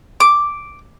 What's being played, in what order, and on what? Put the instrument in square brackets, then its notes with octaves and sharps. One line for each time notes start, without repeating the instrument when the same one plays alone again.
[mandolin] D6